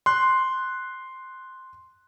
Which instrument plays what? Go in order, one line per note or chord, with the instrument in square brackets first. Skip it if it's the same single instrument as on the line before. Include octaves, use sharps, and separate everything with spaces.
[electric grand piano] C6 F#6